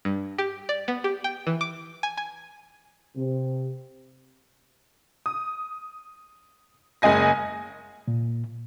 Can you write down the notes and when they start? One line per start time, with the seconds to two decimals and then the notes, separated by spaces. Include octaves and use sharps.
0.05 G2
0.38 G4
0.69 D5
0.88 B3
1.04 G4
1.24 G5
1.47 E3
1.61 D6
2.03 G#5
2.17 G#5
3.17 C3
5.26 D#6
7.02 F#1 G#3 D#5 G#5 A#6
8.08 A#2